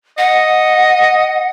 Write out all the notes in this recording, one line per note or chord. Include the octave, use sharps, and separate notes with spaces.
D#5 F#5